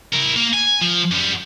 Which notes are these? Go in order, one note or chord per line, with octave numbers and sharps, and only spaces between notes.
E4 A#4
A#3
G#5
F3
F#2 G3